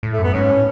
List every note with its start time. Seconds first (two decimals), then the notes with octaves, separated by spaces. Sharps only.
0.03 A2
0.13 A3
0.19 F#2
0.24 B3
0.34 G#2 C#4
0.50 A2